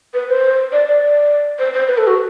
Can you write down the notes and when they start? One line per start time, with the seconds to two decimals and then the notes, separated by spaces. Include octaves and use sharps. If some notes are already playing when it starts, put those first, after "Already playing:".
0.14 B4
0.29 C5
0.72 D5
0.86 D5
1.59 C5
1.74 C5
1.88 B4
1.98 A4
2.07 F#4